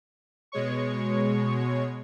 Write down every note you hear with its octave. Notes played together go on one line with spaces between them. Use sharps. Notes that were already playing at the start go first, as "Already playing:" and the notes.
B2 G#3 C#5 C#6